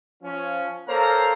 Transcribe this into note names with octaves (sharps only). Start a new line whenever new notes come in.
F3 C#4
A#3 A4 C5 C#5 F5 A#5